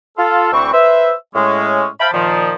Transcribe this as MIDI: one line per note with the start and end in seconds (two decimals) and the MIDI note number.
0.18 0.51 65
0.18 0.51 69
0.52 0.71 38
0.52 0.71 52
0.52 0.71 60
0.52 0.71 85
0.73 1.13 71
0.73 1.13 72
0.73 1.13 76
1.34 1.87 45
1.34 1.87 56
1.34 1.87 61
1.34 1.87 73
2.00 2.09 72
2.00 2.09 76
2.00 2.09 77
2.00 2.09 79
2.00 2.09 81
2.00 2.09 83
2.13 2.55 46
2.13 2.55 51
2.13 2.55 53